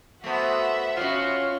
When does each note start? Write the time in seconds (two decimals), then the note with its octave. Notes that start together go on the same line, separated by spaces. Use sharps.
0.24 A3 B3 F#4 C5 E5 F#5
0.97 B2 C#4 F4 F#4 C#5